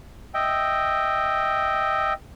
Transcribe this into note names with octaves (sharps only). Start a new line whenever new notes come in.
D#5 E5 G5